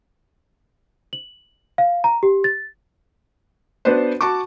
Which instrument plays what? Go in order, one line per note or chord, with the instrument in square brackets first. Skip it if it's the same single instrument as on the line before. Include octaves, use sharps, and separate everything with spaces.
[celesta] F#7
F5
A#5
G4
A6
[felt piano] B3 D4 F#4 B4 C5
F#4 A5 C#6 D6